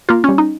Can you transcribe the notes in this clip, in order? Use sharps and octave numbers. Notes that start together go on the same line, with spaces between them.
A#3 F4
G3 C#4
D#4